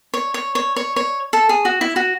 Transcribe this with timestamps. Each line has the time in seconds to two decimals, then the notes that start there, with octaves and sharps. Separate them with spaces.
0.14 C#5
0.34 C#5
0.55 C#5
0.76 C#5
0.96 C#5
1.33 A4
1.49 G#4
1.65 F#4
1.81 E4
1.96 F#4